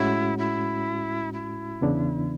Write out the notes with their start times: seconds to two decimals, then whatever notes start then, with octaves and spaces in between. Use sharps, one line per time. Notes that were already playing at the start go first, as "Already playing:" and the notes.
Already playing: A2 G#3 C#4 E4 F#4
0.38 E4
1.33 E4
1.81 E2 C#3 E3 B3 D4